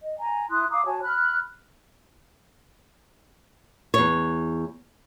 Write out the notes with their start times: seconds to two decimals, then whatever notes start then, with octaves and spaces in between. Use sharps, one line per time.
0.01 D#5
0.18 G#5 A#5
0.50 E4 C6 D#6 F#6
0.71 F5 A#5 D6 D#6
0.86 F#4 C#5 G#5 A5
1.03 B5 F6 F#6
3.94 E2 C#5